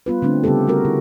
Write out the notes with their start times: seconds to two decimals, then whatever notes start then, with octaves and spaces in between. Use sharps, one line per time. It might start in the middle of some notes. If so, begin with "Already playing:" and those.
0.06 G3 B3 F4 B4
0.22 D3 A3 C4 D4
0.44 C#3 G3 B3 G4 A4
0.67 G3 B3 F#4 A#4
0.85 D3 E4